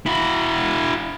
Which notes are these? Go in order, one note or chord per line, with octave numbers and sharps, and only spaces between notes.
E4 F#4